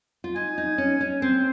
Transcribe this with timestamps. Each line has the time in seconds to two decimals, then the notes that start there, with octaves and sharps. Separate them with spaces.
0.24 F4
0.36 D#4 G#5
0.58 D#4
0.78 C#4
1.01 C#4
1.22 C4 C5